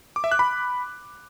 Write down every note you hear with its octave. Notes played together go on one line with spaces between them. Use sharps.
D6
E5
F#6
B5